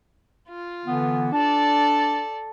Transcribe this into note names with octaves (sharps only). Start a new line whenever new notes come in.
F4
D3 E3 B3
D4 A4 D5 A5